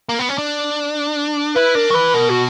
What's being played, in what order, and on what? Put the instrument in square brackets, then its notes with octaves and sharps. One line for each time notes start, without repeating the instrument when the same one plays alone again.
[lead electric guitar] A#3
B3
C#4
D4
[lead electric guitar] E4 [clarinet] B4
[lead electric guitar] D4 [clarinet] A#4
[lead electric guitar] F#3
[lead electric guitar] E3 [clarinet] B4
[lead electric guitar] B2 [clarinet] A#4
[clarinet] F#4